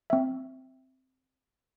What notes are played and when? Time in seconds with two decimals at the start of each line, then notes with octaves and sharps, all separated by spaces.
0.10 C4 E5